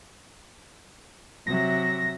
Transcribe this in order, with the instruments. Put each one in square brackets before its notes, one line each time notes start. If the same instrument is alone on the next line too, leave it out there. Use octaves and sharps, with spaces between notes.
[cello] C3 E5 [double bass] F#3 [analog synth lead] A#6